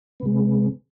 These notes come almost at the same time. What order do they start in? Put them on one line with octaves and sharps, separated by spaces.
B3 C3 G#3